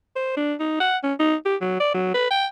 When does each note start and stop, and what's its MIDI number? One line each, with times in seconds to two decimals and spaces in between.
0.16 0.35 72
0.37 0.54 62
0.60 0.76 63
0.80 0.97 78
1.03 1.13 61
1.19 1.35 63
1.45 1.56 67
1.61 1.79 54
1.80 1.91 74
1.94 2.11 54
2.14 2.27 71
2.30 2.46 79